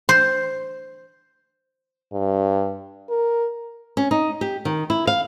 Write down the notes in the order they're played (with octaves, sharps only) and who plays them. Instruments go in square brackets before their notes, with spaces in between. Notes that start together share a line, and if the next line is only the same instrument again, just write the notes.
[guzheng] C5
[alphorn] G2
A#4
[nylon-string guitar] C#4
D#4
G4
D#3
E4
F5